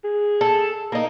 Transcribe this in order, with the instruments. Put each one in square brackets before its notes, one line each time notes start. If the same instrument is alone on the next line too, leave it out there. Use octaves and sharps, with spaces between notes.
[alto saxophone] G#4
[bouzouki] A4
A#3 D#4